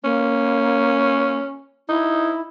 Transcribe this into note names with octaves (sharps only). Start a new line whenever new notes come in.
A#3 C#4
D#4 E4